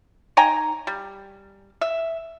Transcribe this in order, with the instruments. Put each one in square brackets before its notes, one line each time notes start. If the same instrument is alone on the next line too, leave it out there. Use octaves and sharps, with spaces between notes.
[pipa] D#4 G5 G#5 A#5
G3
E5